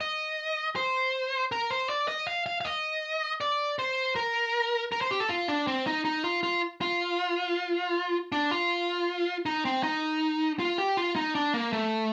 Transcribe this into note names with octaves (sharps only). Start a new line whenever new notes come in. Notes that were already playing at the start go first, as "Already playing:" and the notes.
D#5
C5
A#4
C5
D5
D#5
F5
F5
F5
D#5
D5
C5
A#4
A#4
C5
G4
A4
F4
D4
C4
D#4
D#4
F4
F4
F4
D4
F4
D#4
C4
D#4
F4
G4
F4
D#4
D4
A#3
A3